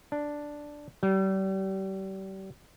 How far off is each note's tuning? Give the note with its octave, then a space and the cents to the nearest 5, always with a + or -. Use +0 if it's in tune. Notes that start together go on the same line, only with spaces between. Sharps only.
D4 +0
G3 -35